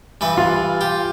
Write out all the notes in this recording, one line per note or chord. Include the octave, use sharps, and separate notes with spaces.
G2 E3 B4
F4
G4